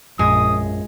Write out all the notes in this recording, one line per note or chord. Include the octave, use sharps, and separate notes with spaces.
A#1 F#2 G#3 D#6